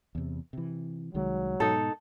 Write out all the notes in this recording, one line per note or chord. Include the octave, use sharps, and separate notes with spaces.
E2 C3
C3 E3
C2 D#3 F#3 G#3
G#2 B2 D#4 A4